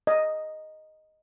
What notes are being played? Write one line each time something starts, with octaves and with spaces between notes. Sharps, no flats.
D#5